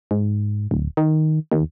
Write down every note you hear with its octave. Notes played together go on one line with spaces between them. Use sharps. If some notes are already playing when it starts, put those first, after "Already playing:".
G#2
D1
D#3
D#2